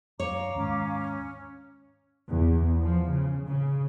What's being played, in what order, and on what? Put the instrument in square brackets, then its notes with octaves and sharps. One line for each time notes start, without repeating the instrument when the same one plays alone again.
[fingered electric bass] F#2 [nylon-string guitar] C#5 [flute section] F5 A#5 D6
[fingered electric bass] D#2 G#2 [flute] C#4
[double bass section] E2
F3
C#3
C#3